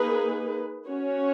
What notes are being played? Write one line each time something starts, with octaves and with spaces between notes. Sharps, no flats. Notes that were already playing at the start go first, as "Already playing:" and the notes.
Already playing: A#3 D#4 G#4 B4
C#4 F#4 C#5